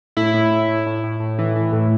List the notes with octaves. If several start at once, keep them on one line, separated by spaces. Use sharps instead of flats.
A2 E4
A2
A2
A2
A2
A2
A2
E3
E3
A2